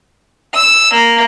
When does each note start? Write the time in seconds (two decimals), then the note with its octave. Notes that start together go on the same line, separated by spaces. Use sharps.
0.53 E6
0.94 A#3